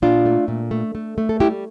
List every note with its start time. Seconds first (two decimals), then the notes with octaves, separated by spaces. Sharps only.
0.02 A#2 D4 F4
0.25 A3
0.48 A#2
0.71 A3
0.95 A3
1.18 A3
1.29 A4
1.40 G3 E4 G4